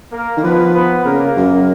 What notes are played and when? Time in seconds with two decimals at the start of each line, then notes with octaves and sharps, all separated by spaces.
0.12 A#3 A#4
0.37 D#3
0.43 F3 B3 B4
0.74 B3 B4
1.05 C#3 A#3 A#4
1.37 F#2